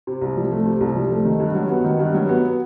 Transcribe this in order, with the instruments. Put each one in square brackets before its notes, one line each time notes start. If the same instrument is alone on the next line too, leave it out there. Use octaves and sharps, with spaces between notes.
[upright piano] C3
C2
F3
A3
C3
C2
F3
A3
D#3
G2
F#3
B3
D#3
G2
F#3
B3